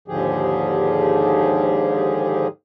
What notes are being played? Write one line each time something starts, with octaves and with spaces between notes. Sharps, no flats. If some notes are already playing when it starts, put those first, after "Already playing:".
D#2 G#2 D3 F3 G4 G#4